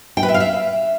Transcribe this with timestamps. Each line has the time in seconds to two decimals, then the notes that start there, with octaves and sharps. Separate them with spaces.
0.17 G5
0.23 B4
0.29 E5
0.34 F5
0.40 E5